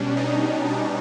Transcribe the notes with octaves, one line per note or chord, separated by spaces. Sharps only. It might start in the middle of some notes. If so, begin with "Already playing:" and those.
Already playing: B2 G3 C#4 D4
D#4
D4